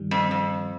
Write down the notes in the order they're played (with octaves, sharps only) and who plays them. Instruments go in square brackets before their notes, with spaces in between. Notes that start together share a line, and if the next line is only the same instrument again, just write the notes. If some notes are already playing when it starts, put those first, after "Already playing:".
Already playing: [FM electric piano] G2 D#3 G3
[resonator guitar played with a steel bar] F2
F2